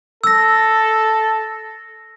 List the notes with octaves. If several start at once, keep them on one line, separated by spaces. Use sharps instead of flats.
A4 E6 A#6